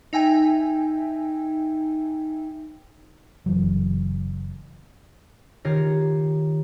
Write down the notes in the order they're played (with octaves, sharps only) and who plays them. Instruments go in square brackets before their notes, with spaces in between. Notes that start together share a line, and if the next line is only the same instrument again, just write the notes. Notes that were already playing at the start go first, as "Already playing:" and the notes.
[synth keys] D#4 E5 G5 G#5
[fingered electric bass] F#1 E3 F#3
[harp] D#3 F4 G4 C#5 F6 A#6